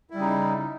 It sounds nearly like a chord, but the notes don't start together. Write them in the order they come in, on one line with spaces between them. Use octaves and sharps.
E4 G3 C#3 D#4